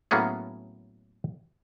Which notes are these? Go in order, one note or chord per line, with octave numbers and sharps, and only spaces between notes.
A2 F#3 A#3 B3 C#4 G#4